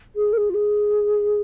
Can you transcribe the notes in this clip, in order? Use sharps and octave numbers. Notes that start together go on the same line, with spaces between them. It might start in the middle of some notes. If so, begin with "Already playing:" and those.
G#4
A#4
G#4
F4
G#4